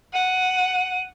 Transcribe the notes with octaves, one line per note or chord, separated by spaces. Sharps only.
F#5 D#7